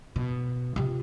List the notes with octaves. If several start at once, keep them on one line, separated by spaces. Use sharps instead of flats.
B2
C3 F4